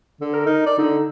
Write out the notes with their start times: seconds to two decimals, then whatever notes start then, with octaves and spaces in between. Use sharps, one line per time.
0.21 D3
0.33 A#4
0.46 D#4
0.66 D5
0.78 D3 D#4